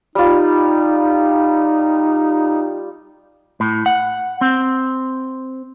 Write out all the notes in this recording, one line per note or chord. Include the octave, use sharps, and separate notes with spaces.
G3 D#4 F4
A2
F#5
C4